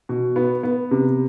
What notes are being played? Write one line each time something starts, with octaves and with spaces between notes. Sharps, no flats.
B2
B3
B3
C3